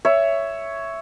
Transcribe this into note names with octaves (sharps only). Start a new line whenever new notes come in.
C#5 E5